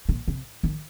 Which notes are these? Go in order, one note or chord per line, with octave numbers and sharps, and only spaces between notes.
A#2
C3
D#3